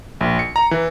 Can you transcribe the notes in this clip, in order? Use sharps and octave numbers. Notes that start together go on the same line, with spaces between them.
A#1
C#7
A#5
E3